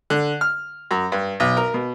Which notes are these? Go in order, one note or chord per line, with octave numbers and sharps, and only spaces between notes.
D3
F6
F#2
G2
B1
A#4
B2